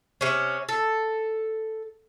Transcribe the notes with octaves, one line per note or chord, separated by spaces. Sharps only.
C3 C#4
A4